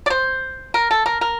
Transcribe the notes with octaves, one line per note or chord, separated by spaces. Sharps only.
D5
C5
A#4
A4
A#4
A#4